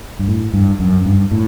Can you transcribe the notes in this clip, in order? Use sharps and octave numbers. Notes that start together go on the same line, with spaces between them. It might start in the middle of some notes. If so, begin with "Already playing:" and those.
G2
A2
G2
F#2
G2
A2